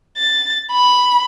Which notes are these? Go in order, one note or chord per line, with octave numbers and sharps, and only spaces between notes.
A6
B5